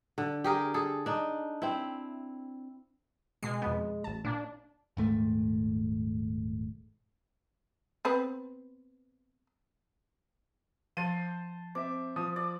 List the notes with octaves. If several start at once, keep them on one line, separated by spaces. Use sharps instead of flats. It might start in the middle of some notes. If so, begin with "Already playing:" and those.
D3
G4 G#4 A#4
G#4 A4
D4 D#4
C4 E4
B2 G#3 C7
F2 B2 B3
A1 A5
A#2 A#3 D4
D#1 G#2 A3
B3 C4 B4
F3 C5 A5 D#7
C4 E5 D6
F3 D#6
D5